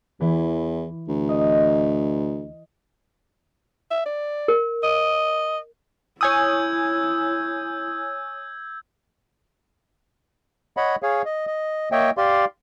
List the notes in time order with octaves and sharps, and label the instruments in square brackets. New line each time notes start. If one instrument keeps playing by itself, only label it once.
[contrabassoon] E2 [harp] E3
[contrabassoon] D2
[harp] D#5
[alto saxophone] E5
D5
[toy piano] A#4
[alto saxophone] D#5
[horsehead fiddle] E4 [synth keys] C#5 G#5 D#6 [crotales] E6 G6 G#6
[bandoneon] C#5 D#5 F#5 B5
G#4 C#5 F5
D#5
D#5
A#3 C#5 D#5 E5 G5
G4 D5 F5 C6